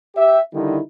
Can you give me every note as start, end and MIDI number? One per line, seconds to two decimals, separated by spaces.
0.15 0.40 67
0.15 0.40 76
0.53 0.79 50
0.53 0.79 51
0.53 0.79 55
0.53 0.79 63
0.53 0.79 64